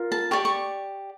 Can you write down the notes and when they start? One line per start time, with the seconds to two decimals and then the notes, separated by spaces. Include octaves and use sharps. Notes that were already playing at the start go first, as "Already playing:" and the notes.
Already playing: F4 A#4
0.12 A5
0.31 G4 D5 C#6
0.45 C#6